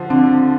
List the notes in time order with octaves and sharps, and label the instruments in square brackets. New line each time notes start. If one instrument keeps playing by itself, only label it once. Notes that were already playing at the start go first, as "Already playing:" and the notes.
Already playing: [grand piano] D3 F3
[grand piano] D3 [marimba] C4 D4